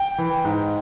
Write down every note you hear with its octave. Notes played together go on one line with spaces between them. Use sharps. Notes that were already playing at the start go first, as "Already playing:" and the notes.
Already playing: G5
E3
G#2